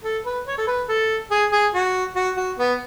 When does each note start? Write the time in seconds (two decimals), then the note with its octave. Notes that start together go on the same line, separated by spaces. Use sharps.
0.04 A4
0.26 B4
0.47 C#5
0.58 A4
0.67 B4
0.88 A4
1.31 G#4
1.52 G#4
1.74 F#4
2.16 F#4
2.37 F#4
2.59 B3